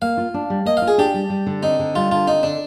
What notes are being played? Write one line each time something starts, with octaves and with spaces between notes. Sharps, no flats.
A#3 F5
F4
D4
G3
A#3 D#5
F5
F4
G#4
D4 G4
G3
G3
D3
C4 D#4
D3
G3 F4
D3 F4
C4 D#4
D3 D4